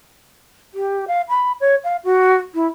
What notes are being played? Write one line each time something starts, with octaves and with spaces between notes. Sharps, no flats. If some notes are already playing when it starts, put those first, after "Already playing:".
G4
F5
B5
C#5
F5
F#4
E4